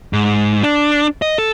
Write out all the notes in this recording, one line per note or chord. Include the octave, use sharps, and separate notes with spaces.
G#2
D4
D#5
A4